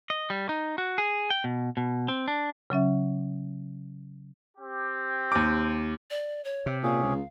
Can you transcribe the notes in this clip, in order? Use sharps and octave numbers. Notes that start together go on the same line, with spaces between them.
D#5
G3
D#4
F#4
G#4
G5
B2
B2
C4
D4
C#3 F#3 C#4 E5
C4 G4
D#2 D6
D5
C#5
C3
A#2 C#4 G#4 F5
C#2